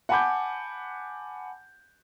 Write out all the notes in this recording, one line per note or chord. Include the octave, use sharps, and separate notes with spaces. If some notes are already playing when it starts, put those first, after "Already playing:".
F#5 G#5 A5 B5 D6 G6